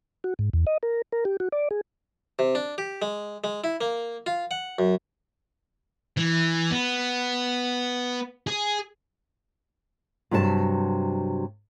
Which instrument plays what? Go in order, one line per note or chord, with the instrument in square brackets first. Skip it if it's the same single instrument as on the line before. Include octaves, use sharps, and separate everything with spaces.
[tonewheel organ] F#4
G#2
E2
D#5
A#4
A#4
G4
F#4
D5
G#4
[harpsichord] C3
D4
G4
G#3
G#3
E4
A#3
F4
F#5
F#2
[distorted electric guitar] E3
B3
G#4
[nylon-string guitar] G2 C3 F#3 A#4 A5